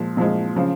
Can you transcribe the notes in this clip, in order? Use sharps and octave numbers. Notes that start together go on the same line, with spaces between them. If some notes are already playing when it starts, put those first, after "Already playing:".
Already playing: A#2 F3 G#3
A#2 F3 G#3
C#3 F3